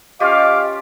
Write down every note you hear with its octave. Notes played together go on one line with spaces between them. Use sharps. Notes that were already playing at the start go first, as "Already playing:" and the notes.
C#4 F4 G4 D#5 F5 D6